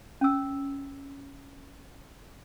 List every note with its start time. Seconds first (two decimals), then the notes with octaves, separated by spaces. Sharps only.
0.21 C#4 E6